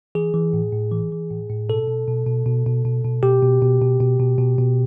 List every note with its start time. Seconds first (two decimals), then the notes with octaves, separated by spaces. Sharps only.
0.15 E3 G#4
0.34 E3
0.53 A2
0.73 A2
0.92 E3
1.12 E3
1.31 A2
1.49 A2
1.69 B2 A4
1.88 B2
2.08 B2
2.27 B2
2.46 B2
2.66 B2
2.85 B2
3.04 B2
3.23 B2 G4
3.43 B2
3.62 B2
3.82 B2
4.00 B2
4.20 B2
4.38 B2
4.59 B2